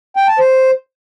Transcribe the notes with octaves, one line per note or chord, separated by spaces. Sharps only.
G5
A5
C5